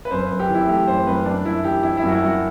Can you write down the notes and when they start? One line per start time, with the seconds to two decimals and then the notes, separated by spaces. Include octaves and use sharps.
0.05 B4
0.11 F#2 C5
0.25 F#2 B4
0.40 G4
0.49 E3
0.54 E4
0.68 A3 G4
0.88 F#2 C5
1.06 F#2 B4
1.26 F#2 D4
1.45 F#2 E4
1.64 E3 G4
1.83 G3 E4
1.97 E4
2.02 F#2 F#4
2.12 E4
2.22 F#2 F#4